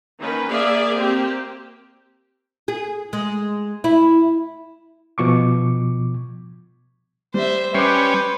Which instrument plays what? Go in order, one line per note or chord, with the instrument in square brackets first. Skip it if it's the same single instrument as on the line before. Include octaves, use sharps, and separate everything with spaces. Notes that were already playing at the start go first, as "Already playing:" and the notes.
[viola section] D#3 A#3 C#4 B4
A#3 G#4 D5 E5 F5
A#3 C4 G4
[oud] G#4
G#3
E4
[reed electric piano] B2 F3 C#6 D6
[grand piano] G3 [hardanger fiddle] C5 E5
[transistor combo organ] G3 C#4 [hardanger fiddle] B4 C5 [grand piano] D6 C7